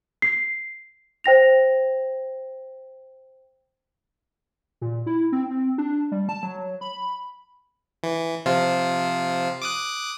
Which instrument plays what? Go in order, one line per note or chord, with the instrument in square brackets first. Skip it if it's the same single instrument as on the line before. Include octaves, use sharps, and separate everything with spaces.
[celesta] C7
C5 G5 A#6 F7
[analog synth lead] A#2
E4
C4
C4
D4
G3
A5
F#3
B5
[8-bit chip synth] E3
C3 F3 F4
D6 D#6 F#6